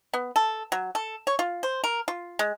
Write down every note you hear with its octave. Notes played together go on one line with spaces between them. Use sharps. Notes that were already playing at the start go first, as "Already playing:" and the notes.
B3
A4
F#3
A4
C#5
F4
C5
A#4
F4
G#3